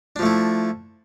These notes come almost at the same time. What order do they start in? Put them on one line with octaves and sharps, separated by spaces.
D4 F3 A3 E4